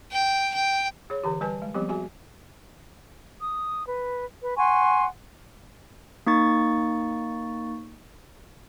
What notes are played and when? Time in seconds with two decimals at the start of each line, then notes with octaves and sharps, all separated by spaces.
0.12 G5
0.55 G5
1.10 G#4 C#5
1.24 D3 E3 G4
1.41 G3 B4 G#5 A5
1.62 G#3
1.74 F3 G3 B3 C4 G4
1.89 F#4 G#4 E5 G#5
3.40 D#6
3.87 B4
4.41 B4
4.57 F#5 G#5 C6 C#6
6.27 A#3 D#4 C#6 A6